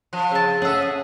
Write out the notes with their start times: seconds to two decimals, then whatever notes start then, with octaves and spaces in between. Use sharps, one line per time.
0.13 F3
0.31 C#3 C4 A5
0.62 C#4 G#4 A4 E5 F#5
0.82 D#6